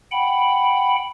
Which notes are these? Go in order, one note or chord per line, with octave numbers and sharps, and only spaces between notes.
F#5 G5 B5